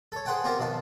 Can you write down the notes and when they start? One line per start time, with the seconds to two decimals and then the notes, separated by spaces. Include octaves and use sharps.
0.12 A4 C#5
0.25 G#4 B4 C5 F#5 G5 A5
0.44 B3 C4 F4 G4 A#4 C5
0.59 B1 D#3 F3 A5